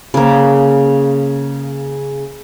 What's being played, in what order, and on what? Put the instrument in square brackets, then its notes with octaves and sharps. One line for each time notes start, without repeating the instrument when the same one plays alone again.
[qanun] C#3 A#3